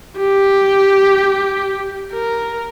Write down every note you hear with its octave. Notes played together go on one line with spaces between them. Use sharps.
G4
A#4